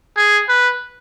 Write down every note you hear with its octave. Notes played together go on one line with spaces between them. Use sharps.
G#4
B4